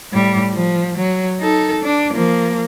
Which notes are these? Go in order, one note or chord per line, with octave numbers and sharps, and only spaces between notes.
A2 G3
F3
F#3
D#4 A4
D4
F3 A#3